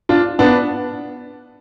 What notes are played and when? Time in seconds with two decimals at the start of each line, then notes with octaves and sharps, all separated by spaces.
0.09 D4 F4
0.39 B3 D4